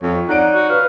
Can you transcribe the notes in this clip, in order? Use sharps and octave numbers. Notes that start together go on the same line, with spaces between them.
F2 C#5
D#4 C#5 D5 F#5 D7
F#4
B4 F5